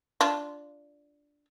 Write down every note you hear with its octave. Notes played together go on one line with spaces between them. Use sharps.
D4 F4